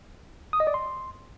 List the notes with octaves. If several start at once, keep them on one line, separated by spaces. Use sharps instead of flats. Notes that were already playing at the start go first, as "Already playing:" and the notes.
D#6
D#5
D5
C6